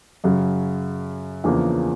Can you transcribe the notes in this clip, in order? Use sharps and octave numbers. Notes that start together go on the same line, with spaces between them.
F#2 C#3 F#3
E2 C#3 F3 A#3 D4